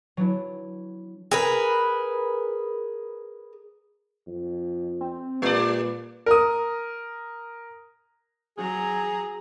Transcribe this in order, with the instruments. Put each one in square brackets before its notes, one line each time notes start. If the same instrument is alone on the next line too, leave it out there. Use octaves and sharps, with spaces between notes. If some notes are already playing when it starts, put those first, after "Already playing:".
[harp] F#3 B3 D4 E4
[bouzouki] G#4 A#4 B4
[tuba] F2
[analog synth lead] C4
[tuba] A#2 [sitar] G3 D5 [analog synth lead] B4
[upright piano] A#4 D#6
[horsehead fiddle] F#3 A#5 [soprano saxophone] G#4